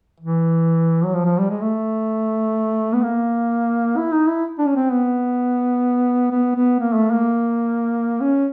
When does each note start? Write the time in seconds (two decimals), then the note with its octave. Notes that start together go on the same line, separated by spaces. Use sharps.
0.20 E3
1.04 F#3
1.14 F3
1.25 F3
1.38 G3
1.50 G#3
1.61 A3
2.93 B3
3.03 A#3
3.97 E4
4.12 D#4
4.28 E4
4.59 D4
4.67 C#4
4.76 C4
4.92 B3
6.32 B3
6.56 B3
6.80 A#3
6.95 A3
7.11 A#3
8.21 C#4